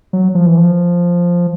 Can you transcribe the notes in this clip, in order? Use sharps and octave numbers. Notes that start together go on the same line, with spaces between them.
F#3
F3
E3
F3